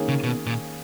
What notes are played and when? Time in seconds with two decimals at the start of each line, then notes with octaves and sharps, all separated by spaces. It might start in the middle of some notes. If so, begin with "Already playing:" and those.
Already playing: D#3 A#3 C#4 G#4
0.09 C#3
0.24 B2
0.47 A#2